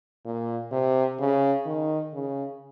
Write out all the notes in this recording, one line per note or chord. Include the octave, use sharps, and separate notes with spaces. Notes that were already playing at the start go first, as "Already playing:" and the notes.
A#2
C3
C#3
D#3
C#3